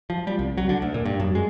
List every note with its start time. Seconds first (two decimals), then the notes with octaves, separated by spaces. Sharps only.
0.10 F3
0.27 G3
0.39 C2
0.57 F#3
0.69 D3
0.82 D2
0.94 A#2
1.05 G2
1.20 F#2
1.35 G#3